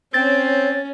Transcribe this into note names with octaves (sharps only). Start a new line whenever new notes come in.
C4 C#4 C#5 A6